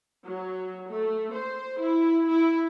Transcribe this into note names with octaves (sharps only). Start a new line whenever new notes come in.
F#3
A3
C5
E4
E4